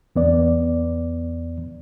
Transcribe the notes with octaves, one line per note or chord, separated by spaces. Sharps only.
E2 B3 D5